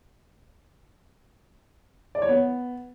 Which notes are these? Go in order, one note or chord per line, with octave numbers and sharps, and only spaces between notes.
D5
C#5
B3